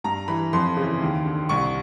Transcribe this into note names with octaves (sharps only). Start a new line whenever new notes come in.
G2 A#5
E3 B5
F2 C6
C#3 E3
D#2
D3
C2 C#6